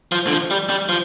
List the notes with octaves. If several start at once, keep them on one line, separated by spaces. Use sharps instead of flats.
F3
D3
F3
G3
G3
F3